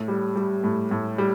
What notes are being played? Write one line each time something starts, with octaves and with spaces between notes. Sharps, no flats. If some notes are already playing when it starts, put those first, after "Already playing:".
Already playing: A2
G3
G3
A2
A2
G3